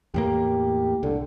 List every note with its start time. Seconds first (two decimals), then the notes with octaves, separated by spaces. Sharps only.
0.14 E2 A2 A#3 G4
1.03 C2 D3